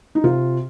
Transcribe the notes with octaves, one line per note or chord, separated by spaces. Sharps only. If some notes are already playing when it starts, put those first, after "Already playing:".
D#4
C3 F4